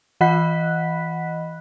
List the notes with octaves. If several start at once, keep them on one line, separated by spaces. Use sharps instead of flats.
E3 D#5 F#5 B5 F#6 B6